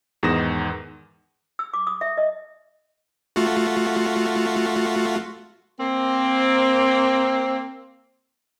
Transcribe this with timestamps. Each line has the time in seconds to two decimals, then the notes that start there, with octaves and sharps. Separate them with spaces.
0.23 E2 G#2 D#3 D#6 A#6 E7
1.59 E6
1.73 D6
1.87 D#6
2.01 E5
2.18 D#5
3.36 A3 F4 F#4
5.80 A#3 C4